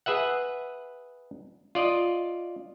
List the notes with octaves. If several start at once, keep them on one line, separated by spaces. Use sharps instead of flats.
G#4 B4 E5 F#5
F4 D5 D#5